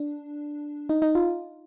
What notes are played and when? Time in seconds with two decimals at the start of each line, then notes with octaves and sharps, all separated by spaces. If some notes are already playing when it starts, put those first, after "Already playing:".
Already playing: D4
0.89 D#4
1.02 D#4
1.15 F4